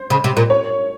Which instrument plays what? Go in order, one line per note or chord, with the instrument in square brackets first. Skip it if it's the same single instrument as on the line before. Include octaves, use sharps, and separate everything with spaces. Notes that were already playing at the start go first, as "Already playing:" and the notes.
Already playing: [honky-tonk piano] C5
[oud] C#3
C3
A#2
[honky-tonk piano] C#5